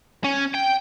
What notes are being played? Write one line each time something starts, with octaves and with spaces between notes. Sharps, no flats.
C#4
G5